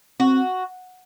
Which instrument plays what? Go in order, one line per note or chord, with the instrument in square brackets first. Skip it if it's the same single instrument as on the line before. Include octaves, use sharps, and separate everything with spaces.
[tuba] C4 [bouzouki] F#4